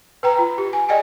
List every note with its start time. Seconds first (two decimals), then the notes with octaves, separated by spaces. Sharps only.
0.23 B4 G5 A#5
0.39 F4
0.58 G4
0.73 G#5
0.89 G#4 D5 D#5 G5 G#5